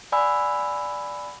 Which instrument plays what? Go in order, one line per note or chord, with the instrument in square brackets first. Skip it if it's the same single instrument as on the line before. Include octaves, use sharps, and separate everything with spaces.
[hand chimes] D5 F#5 G#5 B5 E6